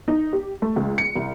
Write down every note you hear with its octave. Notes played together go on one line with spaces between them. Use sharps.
D#4
G4
A3
C#2
C#7
C2